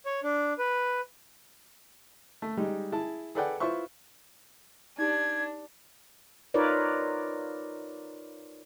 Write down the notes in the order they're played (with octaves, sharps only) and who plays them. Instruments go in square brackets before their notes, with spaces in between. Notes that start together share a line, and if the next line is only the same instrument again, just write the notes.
[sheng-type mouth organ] C#5
D4
B4
[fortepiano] A3
G3 G#3 D#4 G4
E4 G#4 A5
G#4 A4 B4 D5 F#5 G5
E4 F4 B4 C5 E5 C#6
[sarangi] D4 [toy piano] D#4 G4 [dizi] G#6
[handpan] D#4 F4 A#4 B4 C#5 D5